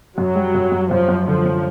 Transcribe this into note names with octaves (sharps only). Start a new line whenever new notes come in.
F#2 F#3
G3
F#2
F#2
F#2 F3
F#2
D3 F3
F#2